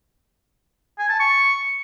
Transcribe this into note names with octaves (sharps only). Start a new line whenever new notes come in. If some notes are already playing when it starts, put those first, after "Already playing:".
G#5
A5
C#6